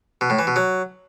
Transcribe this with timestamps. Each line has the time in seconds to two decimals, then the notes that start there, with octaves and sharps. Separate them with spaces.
0.21 B2
0.30 A2
0.39 E3
0.47 B2
0.56 F#3